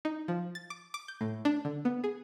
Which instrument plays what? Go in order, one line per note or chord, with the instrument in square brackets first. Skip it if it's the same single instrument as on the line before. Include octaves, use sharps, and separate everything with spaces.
[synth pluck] D#4
F3
A6
D6
D6
G6
A2
D4
D3
B3
G#4